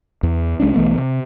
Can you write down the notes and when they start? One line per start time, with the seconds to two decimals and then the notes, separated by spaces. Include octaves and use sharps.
0.23 E2
0.60 C2 G#3 C#4 D4
0.74 B1 E3 A3 B3
0.97 C3